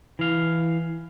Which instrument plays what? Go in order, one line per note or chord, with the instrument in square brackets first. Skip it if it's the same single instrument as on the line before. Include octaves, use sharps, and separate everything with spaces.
[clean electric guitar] E3 F5